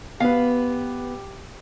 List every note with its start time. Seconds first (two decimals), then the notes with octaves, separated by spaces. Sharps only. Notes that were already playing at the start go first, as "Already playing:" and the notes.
0.20 B3 G4 B4 F5